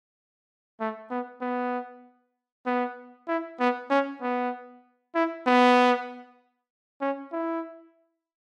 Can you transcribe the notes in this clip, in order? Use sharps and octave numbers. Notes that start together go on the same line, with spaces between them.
A3
B3
B3
B3
E4
B3
C#4
B3
E4
B3
C#4
E4